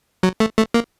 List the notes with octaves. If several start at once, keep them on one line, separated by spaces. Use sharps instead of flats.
F#3
A3
A3
A#3